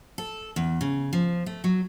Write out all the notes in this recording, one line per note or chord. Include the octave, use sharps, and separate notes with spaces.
A4
E2
C#3
F3
A3
F#3